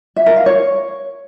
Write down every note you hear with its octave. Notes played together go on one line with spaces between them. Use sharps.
E5
A#4
F5
C#5